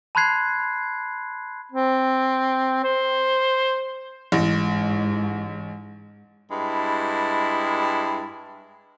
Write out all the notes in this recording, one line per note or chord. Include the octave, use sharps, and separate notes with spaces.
A5 B5 C6 F#6 G#6 C7
C4
C5
A1 G#2
G2 G#3 E4